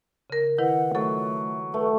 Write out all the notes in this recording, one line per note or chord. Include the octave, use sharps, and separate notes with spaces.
C#3 A#4
D#3 E4 B4 F#5
F#3 A3 A4
A3 B4